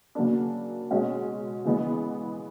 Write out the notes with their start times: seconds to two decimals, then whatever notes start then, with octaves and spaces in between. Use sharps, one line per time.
0.15 C#3 F#3 A#3 D4
0.91 B2 G#3 C#4 F#4
1.65 C#3 E3 G#3 B3